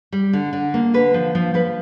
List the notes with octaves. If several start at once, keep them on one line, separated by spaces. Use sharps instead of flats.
G3
D3
D3
A#3
D3 B4
F3
F3
F3 B4